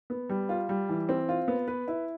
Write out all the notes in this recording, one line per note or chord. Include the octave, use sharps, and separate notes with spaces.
B3
G3
F4
G3
E3
C4
F4
B3
B4
E4